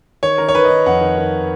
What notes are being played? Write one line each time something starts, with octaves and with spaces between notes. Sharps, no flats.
D#3 C#5
D#3 A#4
C#5
D#3 B4
D#5
D#3
F2 F#5
D#3
D#3